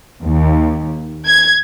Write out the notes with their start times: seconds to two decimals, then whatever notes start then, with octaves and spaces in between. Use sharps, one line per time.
0.24 D#2
1.24 G#6